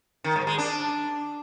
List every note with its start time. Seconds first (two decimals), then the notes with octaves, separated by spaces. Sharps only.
0.24 D#3
0.36 G#2
0.47 G#3
0.58 D4